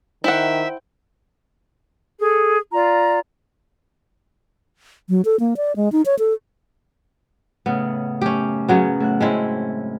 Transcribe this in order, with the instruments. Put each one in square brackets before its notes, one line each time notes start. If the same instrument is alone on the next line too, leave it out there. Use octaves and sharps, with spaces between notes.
[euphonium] D#3 [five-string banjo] E4 F#5 [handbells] C5 G5 [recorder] E5
[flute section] G#4 A4
F4 D5 A#5
[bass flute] F#3
A4
A#3
D5
G#3
D#4
C#5
A4
[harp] A2 C#3 [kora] B3
[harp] F#2 A3 [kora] C#4 G4
[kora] C#3 F#3 B3
[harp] A2 F#4 F#6
[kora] G#3 C4 E4 [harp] C#4 A4 F#5